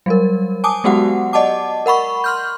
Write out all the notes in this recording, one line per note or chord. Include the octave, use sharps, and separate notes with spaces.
F#3 G3 A#4
G#5 A5 D6 D#6
F#3 G#3 B3 F#4 G4 F#5
D5 D#5 F#5 A5 D6
A#4 F#5 B5 C#6
C6 F6 G6